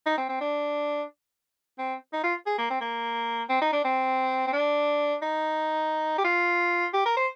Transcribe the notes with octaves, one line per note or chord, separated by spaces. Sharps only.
D#4
C4
C4
D4
C4
D#4
F4
G#4
A#3
C4
A#3
C4
D#4
D4
C4
C4
D4
D#4
G4
F4
G4
A#4
C5